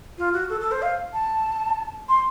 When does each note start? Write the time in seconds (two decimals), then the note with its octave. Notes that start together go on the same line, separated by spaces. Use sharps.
0.18 F4
0.33 F#4
0.49 A4
0.61 A4
0.71 C5
0.82 F5
1.13 A5
2.09 C6